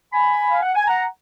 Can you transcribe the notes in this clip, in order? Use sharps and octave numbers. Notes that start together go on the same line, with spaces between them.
G#5 B5
F5
F#5
G#5
F#5 A#5